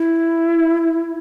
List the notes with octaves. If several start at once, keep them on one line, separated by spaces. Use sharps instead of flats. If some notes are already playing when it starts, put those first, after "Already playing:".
Already playing: E4